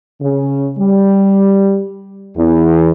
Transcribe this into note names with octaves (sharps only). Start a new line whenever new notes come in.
C#3
G3
E2